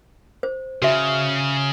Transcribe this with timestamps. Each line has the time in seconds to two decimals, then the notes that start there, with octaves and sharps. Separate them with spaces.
0.43 C5
0.82 C#3 F#4 E5